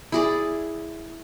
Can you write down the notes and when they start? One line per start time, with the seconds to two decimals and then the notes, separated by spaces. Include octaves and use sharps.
0.12 E4 G#4 D5